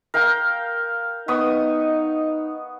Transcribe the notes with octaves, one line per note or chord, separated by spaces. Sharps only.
A#4 F5 G5
B3 D#4 C#6 D#6